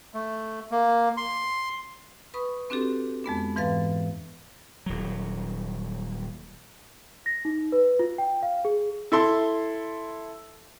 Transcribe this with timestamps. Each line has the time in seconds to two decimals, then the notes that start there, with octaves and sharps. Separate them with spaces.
0.14 A3
0.71 A#3
1.17 C6
2.34 B4 B5 C#6 D#6
2.70 C4 D4 F#4 G4 A4
3.24 F2 G#3 B3 D4
3.56 G#2 E3 B4 F5 A6
4.86 D#1 F#3
7.26 A#6
7.45 D#4
7.72 B4
7.99 F4
8.18 G5
8.43 F5
8.65 G#4
9.12 E4 A4 C6